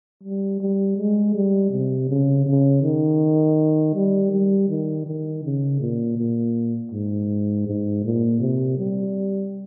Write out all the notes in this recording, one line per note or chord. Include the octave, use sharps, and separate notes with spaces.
G3
G3
G#3
G3
C3
C#3
C#3
D#3
G3
G3
D#3
D#3
C#3
A#2
A#2
G#2
G#2
A#2
C3
G3